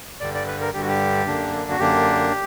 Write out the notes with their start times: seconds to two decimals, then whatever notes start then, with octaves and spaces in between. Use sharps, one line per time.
0.20 G2 D3 G3 D5
0.34 D5
0.47 B4
0.61 A#4
0.74 G2 D3 G3 G4
0.80 F#4
0.88 G4
1.27 F#2 D3 A#3 D4
1.71 F#4
1.79 F#2 D3 A#3 D4 G4